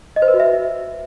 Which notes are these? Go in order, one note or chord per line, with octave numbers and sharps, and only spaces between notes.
D#5
C5
B4
F#4
E5